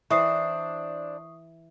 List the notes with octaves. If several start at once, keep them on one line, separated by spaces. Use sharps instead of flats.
E3 D4 C5 C#6 D#6 C7